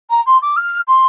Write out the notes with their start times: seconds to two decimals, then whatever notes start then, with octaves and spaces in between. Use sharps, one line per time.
0.09 A#5
0.26 C6
0.41 D6
0.56 F6
0.87 C6